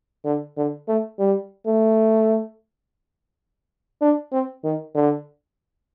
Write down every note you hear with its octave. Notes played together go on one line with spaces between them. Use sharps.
D3
D3
A3
G3
A3
D4
C4
D#3
D3